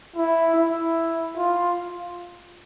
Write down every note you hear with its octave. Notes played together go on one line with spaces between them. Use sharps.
E4
E4
F4